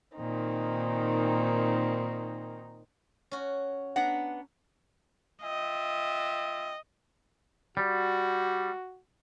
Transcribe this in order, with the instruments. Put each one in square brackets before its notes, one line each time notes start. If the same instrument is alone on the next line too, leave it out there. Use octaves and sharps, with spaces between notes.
[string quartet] A#2 D#3 C4 D#4
[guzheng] C#4 F#4
[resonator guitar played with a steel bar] B3 D4 F#5 [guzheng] A#5
[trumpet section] F4 E5 G5 [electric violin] D#5
[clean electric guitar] G3 [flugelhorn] F#4